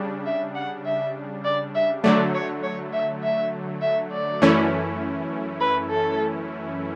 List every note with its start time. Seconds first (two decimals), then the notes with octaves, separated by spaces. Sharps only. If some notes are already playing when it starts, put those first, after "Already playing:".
Already playing: C#3 G3 D4
0.26 E5
0.55 F#5
0.86 E5
1.44 D5
1.75 E5
2.04 D3 F#3 A3 D5
2.34 C#5
2.63 C#5
2.93 E5
3.23 E5
3.82 E5
4.12 D5
4.42 F#2 E3 A3 C#4 E4
5.60 B4
5.90 A4